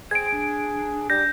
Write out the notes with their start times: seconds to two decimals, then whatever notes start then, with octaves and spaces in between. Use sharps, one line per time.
0.11 G#4 C5 G5 G#6 D7
0.32 D4
1.10 G3 G6 A#6